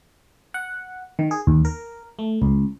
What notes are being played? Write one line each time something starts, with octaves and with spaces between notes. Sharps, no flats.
F#5
D#3
G#4
D#2
A#4
A3
C#2